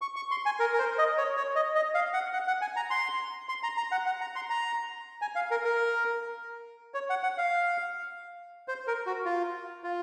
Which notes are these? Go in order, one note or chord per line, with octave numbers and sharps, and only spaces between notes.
C#6
C#6
C6
G#5
A#4
A#4
C5
D#5
C#5
C#5
D#5
D#5
F5
F#5
F#5
F#5
G#5
A#5
C6
C6
A#5
A#5
F#5
F#5
A#5
C6
A#5
G#5
F5
A#4
A#4
C#5
F#5
F#5
F5
C5
A#4
F#4
F4
F4